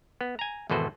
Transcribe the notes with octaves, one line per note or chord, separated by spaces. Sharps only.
B3
G#5 A#5
G#1 E2 B2 A4 B4 C5